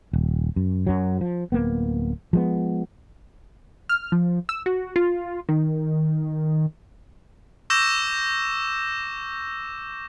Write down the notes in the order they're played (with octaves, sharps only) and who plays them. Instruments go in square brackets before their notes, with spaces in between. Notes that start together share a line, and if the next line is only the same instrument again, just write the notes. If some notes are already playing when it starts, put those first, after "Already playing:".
[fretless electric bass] D#1
F#2
F#2 F#3
F3
D1 A#3 B3
F3 G#3 B3
[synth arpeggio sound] F6
F3
E6
F#4
F4
D#3
[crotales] C#6 D6 E6 G6 A#6 E7